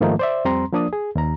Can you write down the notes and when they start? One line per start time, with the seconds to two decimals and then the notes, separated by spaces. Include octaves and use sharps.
0.01 G#2 D#3 F3 A3 A#3 D#4
0.19 C5 D5 E5
0.45 F2 G3 C4 A#5 C6
0.72 F3 A#3 D4 D5 D#6
0.93 G#4
1.15 D#2 A#5